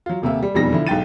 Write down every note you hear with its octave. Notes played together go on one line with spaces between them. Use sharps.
F#3 F4
D#1 C3 A#3 E5
G3
E1 F2 B2 G3 D#4 A#6
D3 F3 E4
B1 G#2 G5 A6 D#7